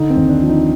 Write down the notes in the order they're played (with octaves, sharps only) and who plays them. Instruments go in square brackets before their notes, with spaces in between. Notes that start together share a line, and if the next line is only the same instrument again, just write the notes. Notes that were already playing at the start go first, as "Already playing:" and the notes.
Already playing: [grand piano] D3 D#4
C4
D#2
D4
F3
D#4